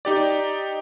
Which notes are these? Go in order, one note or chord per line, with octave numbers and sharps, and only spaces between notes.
D#4 G4 D5